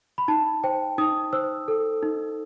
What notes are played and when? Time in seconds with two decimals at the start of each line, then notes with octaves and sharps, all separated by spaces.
0.18 B5
0.28 D#4 A5
0.64 C5 G5
0.98 D#4 D#6
1.33 C5 E6
1.68 A4
2.03 D#4